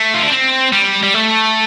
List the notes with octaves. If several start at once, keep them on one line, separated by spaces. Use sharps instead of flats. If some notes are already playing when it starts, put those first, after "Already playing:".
Already playing: A3
F4
D4
C4
G3
G3
A3